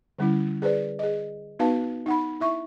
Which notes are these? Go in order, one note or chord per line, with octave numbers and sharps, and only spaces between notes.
D3 G3 C#4 E4
G#4 B4 C5 D5
G#4 D#5
B3 D#4 F#4 B4 F5 A5
D#4 F#5 B5
E4 E5 C#6